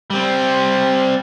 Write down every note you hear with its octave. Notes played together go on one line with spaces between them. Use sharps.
G3 C4